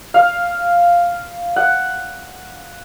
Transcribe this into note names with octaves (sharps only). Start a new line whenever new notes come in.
F5
F#5